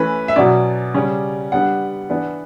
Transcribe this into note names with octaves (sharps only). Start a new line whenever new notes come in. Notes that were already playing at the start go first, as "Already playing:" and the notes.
Already playing: E3 A3 C#4 B4
E5
B2 F#3 C#4 D5
C#3 G3 C#4
D3 G3 B3 D4 F#5
E3 B3 D4